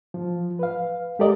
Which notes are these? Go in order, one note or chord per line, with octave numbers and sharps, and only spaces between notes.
F3
B4 F5
G#3 G4 A4 A#4 D5 D#5